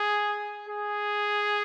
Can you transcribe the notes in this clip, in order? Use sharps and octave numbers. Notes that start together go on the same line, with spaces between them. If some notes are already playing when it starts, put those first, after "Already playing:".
Already playing: G#4
G#4